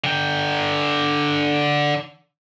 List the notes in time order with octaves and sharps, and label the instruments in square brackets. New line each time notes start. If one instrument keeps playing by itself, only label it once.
[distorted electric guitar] D3 G5